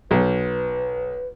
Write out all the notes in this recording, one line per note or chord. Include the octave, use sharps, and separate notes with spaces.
B1 B4